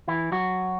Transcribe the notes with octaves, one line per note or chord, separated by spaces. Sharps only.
E3 E4
F#3 F#4